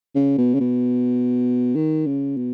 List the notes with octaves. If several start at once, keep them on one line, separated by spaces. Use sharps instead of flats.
C#3
B2
C#3
B2
D#3
C#3
B2